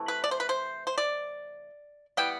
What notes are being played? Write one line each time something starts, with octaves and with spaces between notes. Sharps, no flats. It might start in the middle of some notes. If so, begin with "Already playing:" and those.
Already playing: C3 E3 A3
B4
D5
C5
B4
C5
C5
D5
E3 G3 B3 G5